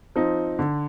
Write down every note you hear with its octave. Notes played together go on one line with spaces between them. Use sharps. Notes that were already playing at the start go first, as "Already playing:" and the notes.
F3 C4 D#4
D3